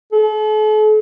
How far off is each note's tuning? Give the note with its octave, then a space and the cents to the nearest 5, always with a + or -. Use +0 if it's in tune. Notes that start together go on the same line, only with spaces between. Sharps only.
A4 -40